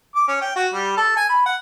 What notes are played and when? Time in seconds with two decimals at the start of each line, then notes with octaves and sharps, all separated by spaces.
0.15 D6
0.28 C#4
0.41 G5
0.56 F#4
0.73 G3
0.97 A4
1.17 G#5
1.29 B5
1.46 F#5